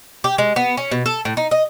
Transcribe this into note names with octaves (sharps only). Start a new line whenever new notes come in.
G4
G#3
B3
C#4
B2
A4
A2
D#4
D#5